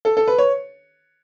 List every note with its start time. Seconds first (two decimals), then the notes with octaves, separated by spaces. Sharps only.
0.05 A4
0.17 A4
0.28 B4
0.38 C#5